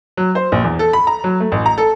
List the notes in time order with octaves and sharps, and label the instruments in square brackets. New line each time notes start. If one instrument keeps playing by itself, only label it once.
[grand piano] F#3
C5
A#1
E2
A4
B5
A#5
F#3
A3
A1
A#5
A4